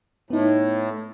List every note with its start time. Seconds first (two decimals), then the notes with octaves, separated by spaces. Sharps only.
0.30 A2 B3 D#4